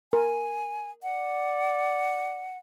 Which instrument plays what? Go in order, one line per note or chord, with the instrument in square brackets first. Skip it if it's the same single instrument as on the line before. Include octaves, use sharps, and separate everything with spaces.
[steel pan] A#4 [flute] G#5
[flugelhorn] D5 [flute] F#5